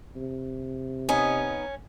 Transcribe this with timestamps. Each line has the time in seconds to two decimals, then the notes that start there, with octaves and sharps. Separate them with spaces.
0.16 C3
1.09 B3 C#4 D#4 G#5